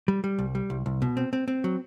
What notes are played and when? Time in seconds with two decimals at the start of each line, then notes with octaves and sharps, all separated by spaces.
0.08 G3
0.24 G3
0.39 C2
0.55 G3
0.70 C2
0.86 C2
1.02 B2
1.17 C4
1.33 C4
1.48 C4
1.64 F#3